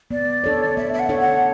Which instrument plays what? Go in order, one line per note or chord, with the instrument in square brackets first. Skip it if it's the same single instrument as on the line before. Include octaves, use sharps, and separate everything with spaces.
[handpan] B3 [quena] D5
[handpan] D4 A4 C#5
[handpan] B3 [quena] E5
[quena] E5
F#5
[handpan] D4 A4 C#5
[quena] F#5